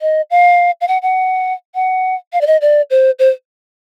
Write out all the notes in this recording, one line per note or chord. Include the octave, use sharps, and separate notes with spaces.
D#5
F5
F5
F#5
F#5
F#5
F5
D5
D#5
D5
C5
C5